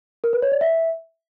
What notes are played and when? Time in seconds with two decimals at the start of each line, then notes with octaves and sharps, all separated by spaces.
0.24 A#4
0.33 B4
0.42 C#5
0.52 D5
0.61 E5